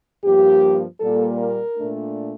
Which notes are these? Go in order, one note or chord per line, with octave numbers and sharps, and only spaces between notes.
G2 F3 A#3 G4
A#2 G3 A#3 A4
A#4
A#2 A3 D4